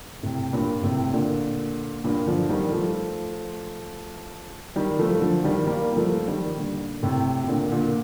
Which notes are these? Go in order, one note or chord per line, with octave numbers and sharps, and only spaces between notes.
A2 C3
G2 A#2
A2 C3
A#2 D3
G2 A#2
D3 F3
D#3 G3
F3 A3
D#3 G3
F3 A3
D3 F3
D#3 G3
G3 A#3
A#3
F3 A3
D#3 G3
A#2 D3
A2 C3
C3
A#2 D3
A#2 D3